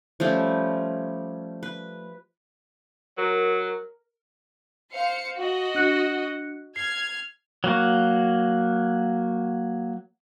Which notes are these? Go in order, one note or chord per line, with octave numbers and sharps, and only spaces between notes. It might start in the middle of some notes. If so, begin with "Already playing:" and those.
F3 G3 A3 C#4
B4
F#3 A#4
C5 F5 C#7
F#4 D#5
D4 F#6 C#7
F6 G#6 C7
F#3 A#3 F#4